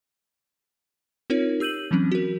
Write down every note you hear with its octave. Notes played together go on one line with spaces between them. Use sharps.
C4 D#4 F4 A#4 C#5
G4 E6 G6 D#7 F#7
E3 F#3 C4 C#4
F#4 A#4